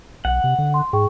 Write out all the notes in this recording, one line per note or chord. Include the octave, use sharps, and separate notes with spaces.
B1 F#5
C3
D3
C6
G#2 G#4 G5 C#6